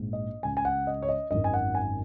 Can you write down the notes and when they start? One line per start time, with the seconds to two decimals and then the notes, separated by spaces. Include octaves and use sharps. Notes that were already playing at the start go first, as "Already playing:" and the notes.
Already playing: A#1 G#2
0.13 D#5
0.43 C#2 C#3 G#5
0.57 G#5
0.65 F#5
0.87 D#5
1.03 C#5
1.09 D#5
1.31 G#1 F#2 D#3 D#5
1.44 G#5
1.54 F#5
1.75 G#5